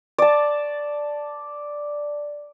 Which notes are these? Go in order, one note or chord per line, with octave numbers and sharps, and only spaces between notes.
D5 A5